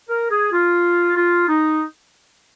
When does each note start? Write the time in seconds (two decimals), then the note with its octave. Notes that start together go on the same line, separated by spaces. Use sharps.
0.09 A#4
0.30 G#4
0.52 F4
1.16 F4
1.49 D#4